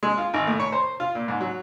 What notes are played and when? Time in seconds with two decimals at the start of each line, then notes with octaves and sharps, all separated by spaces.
0.03 G#3
0.18 F4
0.34 G#1
0.47 A2
0.60 C#5
0.72 C5
1.00 F4
1.15 A#2
1.28 G#2
1.41 F#3